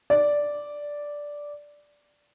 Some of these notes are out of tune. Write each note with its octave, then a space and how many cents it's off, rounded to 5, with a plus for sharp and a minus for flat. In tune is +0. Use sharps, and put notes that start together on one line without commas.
D5 -5